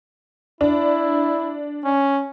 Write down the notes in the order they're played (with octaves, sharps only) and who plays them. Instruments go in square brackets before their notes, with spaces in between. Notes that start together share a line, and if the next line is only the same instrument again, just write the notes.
[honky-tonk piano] D4 [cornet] E4
[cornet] C#4